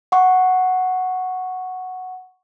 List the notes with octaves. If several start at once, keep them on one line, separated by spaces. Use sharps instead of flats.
F#5 C#6